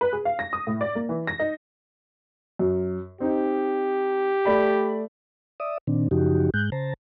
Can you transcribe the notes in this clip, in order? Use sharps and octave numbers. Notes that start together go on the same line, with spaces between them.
B4
G#4
F5
A#6
D#6
A2
D5
A#3
E3
A#6
D#4
F#2
C4 D#4 G4
A3 D5 B5
D5 E5 D#6
A#2 D#3 C4 D4
F#2 C#3 F3 D#4 F#4 G4
G#2 G#3 F#6 G6
C#3 C5 A5 A#5